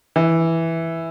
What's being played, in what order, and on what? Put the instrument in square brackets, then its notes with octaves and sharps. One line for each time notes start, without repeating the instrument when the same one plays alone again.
[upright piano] E3